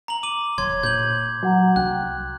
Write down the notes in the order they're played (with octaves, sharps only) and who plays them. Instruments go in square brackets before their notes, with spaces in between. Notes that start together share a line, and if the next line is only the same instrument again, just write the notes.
[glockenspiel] A#5 F#7
[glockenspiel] D6 F#7 [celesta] D#7
[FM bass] E1 [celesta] C#5 [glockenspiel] C6 G#6
[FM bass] A#2 [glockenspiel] G6 G#6 F#7
[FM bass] F#3 [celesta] F#4 F#5 A#5
[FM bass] C2 [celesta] G5 [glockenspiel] F#6